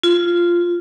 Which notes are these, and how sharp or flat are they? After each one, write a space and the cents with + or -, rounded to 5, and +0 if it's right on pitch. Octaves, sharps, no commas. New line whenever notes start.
F4 -5